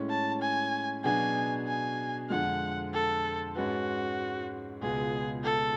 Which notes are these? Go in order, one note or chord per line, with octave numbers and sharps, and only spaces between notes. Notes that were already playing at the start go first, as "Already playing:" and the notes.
Already playing: A2 G#3 C#4
A5
G#5
B2 F#3 B3 D4 G#4 G#5
G#5
F2 D3 F3 G#3 F#5
A4
G#2 G#3 C#4 F#4 G#4 B4
C#2 B2 G#3 B3 F4 G#4
A4